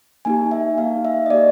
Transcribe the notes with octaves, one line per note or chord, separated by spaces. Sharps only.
A#3 D#4 G4 G#5
E5
A#3 D#4 G4 F5
E5
D#5
A#3 D#4 G4 D5